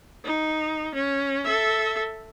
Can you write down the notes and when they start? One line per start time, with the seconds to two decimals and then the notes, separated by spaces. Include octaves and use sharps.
0.24 D#4
0.94 C#4
1.45 A4 E5